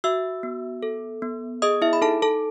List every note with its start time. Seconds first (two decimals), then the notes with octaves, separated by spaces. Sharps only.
0.04 F#4 E5 E6
0.43 B3
0.83 A4
1.22 B3
1.62 G#4 D#5 D#6
1.82 E4 E5
1.93 B5
2.02 D#4 A4 A5
2.22 A4 A5